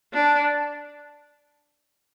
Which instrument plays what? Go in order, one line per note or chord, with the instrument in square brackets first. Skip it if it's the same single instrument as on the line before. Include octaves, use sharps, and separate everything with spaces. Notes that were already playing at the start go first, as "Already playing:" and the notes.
[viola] D4